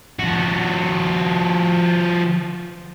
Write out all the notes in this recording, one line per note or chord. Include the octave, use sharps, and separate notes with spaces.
F3 F#4